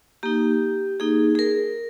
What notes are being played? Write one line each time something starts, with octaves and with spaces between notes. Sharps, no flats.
A#3 D#4 G4
A#3 D#4 G#4
G#4
A#4